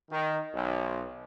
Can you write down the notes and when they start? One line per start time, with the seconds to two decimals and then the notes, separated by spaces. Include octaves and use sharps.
0.11 D#3
0.53 B1